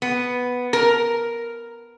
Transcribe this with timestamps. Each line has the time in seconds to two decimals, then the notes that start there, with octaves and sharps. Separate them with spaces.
0.02 B3
0.73 A#4